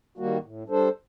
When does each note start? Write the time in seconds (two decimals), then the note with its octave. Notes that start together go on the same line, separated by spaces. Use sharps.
0.18 D#3 G3 A#3 F#4
0.43 A2
0.68 G3 D4 A4 C5